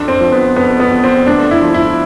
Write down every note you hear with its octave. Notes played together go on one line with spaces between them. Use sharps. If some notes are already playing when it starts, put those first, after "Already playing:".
Already playing: F2 D4
C4
F3
B3
F2 B3
B3
F2
C4
D2 D4
E4
F3
E4